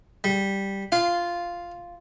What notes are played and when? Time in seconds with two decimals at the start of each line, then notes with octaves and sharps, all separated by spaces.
0.24 G3
0.92 F4 F5